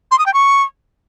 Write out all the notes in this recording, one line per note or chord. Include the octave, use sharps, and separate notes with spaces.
C6
D#6
G5
C#6